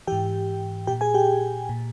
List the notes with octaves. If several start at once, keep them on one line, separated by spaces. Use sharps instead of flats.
G#2 E3 G4 G5
A#2 G4 G5
G#4 G#5
G4 G5
A#2